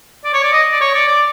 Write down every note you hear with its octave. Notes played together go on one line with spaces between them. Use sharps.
D5
C#5
D5
D#5
D5
C#5
D5
D5